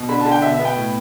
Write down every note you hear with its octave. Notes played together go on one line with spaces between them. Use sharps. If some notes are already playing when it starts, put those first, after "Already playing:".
Already playing: B2
D3 B5
D3 A5
G5
B2 E5
E5
B3
G5
A2